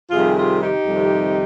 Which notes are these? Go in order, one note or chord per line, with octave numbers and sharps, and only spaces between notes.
F2 C3 D#3 G3 F4 G#4
F4 G#4
D#4 G4
F2 C3 D#3 G3